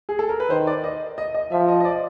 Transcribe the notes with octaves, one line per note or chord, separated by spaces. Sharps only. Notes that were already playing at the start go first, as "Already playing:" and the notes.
G#4
A4
A#4
B4
D#3 C5
D5
D#5
D#5
D#5
F3 E5
D#5
D#5
D5